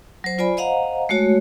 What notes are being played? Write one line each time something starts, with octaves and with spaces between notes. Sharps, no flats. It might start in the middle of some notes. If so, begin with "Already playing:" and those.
F#3 C5
F4 C5 D5 G#5 B5
C5 D#5 F5 F#5 A#5
G#3 A3 F#4 C#5